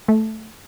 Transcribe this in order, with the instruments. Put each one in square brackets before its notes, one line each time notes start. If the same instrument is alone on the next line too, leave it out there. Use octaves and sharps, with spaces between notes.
[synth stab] A3